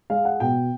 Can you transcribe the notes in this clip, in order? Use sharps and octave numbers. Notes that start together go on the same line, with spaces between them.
G#3 F5
F#5
B2 G5